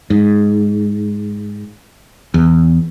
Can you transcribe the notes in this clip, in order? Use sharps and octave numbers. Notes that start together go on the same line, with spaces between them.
G#2
E2